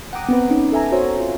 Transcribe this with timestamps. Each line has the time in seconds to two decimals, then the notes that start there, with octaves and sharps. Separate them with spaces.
0.13 F#5 G5 A#5 D6 D#6
0.29 B3 C4 B4
0.50 C#4 D#4
0.72 A4 E5 G#5 A#5
0.92 F#4 C5 C#5 E5 G#5
1.20 F4